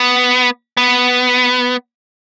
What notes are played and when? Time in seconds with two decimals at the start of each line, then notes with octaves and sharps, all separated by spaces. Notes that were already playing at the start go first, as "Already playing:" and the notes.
Already playing: B3
0.77 B3